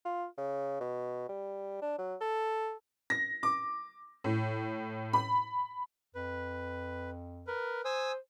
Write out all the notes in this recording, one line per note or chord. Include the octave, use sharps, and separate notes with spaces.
F4
C#3
B2
G3
D4
F#3
A4
A#6
D6
A2
B5
F2 B4
A#4 B4
C5 G#5 D#6 E6